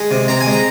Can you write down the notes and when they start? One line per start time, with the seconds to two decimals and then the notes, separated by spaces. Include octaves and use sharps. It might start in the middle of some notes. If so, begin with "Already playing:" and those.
Already playing: G#3
0.11 C3
0.28 C4 A#5
0.41 G#5
0.46 G#3
0.52 A#5